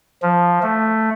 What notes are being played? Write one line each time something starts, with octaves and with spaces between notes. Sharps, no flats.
F3
A3